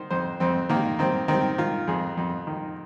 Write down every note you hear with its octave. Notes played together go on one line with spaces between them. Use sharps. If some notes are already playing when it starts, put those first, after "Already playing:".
Already playing: D#3 C5
F2 C5
F2 C4
D#3 A#3
D#3 C4
D#3 C4
D#3 F4
F2 G#4
F2
D#3